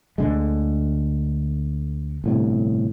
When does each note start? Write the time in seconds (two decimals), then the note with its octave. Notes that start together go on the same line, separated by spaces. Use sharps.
0.18 D2 D3 G#3
2.24 G1 A2 C3